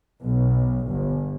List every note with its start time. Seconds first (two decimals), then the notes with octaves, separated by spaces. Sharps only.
0.22 B1
0.87 G1